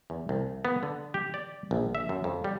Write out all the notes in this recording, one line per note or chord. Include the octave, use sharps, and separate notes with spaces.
E2
C2
B3
D3
G4
D5
A#1
E5
F#2
F2
G3